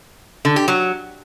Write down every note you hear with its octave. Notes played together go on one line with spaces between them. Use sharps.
D3
G4
F#3